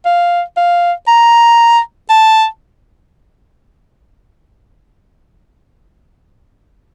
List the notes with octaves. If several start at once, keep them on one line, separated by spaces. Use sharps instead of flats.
F5
F5
A#5
A5